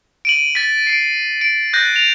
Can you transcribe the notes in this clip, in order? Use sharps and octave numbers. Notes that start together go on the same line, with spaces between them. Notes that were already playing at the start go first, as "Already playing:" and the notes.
D7 D#7 F#7
A6 B6
C7 D7
D7
F#6 G6 A6 A#6
F7